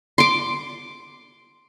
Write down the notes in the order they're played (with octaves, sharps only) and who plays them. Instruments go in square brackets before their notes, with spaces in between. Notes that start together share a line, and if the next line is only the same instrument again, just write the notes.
[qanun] C6 D6